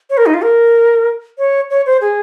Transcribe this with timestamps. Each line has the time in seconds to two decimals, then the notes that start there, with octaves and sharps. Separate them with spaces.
0.10 C#5
0.17 A#4
0.26 D#4
0.34 F4
0.42 A#4
1.38 C#5
1.70 C#5
1.86 C5
2.01 G#4